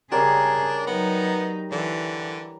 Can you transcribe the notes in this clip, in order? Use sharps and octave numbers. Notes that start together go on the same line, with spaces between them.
C#3 G3 D4 G#4 A#4 C#5
F#3 B3 D#4
D3 E3